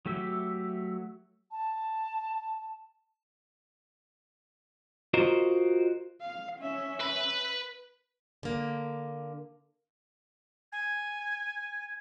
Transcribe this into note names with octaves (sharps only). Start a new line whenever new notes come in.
F#3 A3 G4 E5
A5
F4 F#4 A#4 C5 D#5
F5
C#4 E5
B4 B5
D3 A#3
G#5 G#6